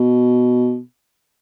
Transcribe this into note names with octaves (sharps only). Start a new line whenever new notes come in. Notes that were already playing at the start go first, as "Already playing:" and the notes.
Already playing: B2